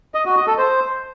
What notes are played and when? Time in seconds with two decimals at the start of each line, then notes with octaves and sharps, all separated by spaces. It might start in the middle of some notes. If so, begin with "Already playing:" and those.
0.15 D#5
0.25 F#4
0.36 D#5
0.47 A4
0.58 C5